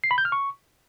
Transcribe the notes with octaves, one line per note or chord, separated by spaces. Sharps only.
C7
B5
G6
F6
C#6